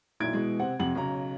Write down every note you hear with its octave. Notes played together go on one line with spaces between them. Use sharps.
B1 A#2 D#3 E4 G#6 D7
B2 E3 G#3
C3 C4 F#5
F2 C3 F#5 F#7
B1 C#3 A#5